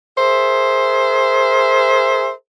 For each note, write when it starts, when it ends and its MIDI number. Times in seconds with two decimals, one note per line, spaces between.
0.18 2.32 68
0.18 2.32 70
0.18 2.32 72
0.18 2.32 76